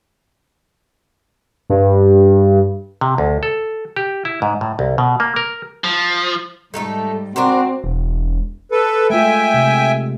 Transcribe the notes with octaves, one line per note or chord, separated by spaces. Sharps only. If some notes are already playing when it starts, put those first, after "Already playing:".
G2
C3
D2
A4
G4
E4
G#2
A2
C2
B2
A#3
A#4
F3
G#2 G3 A3 D#4 A4
C4 D4 F#4 A#4 C5
E1
A4 B4
G#3 A3 F4 E5 G5 G#5
C3 G#3